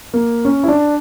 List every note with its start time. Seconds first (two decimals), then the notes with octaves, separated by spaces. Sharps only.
0.14 A#3
0.45 C#4
0.63 E4
0.68 D4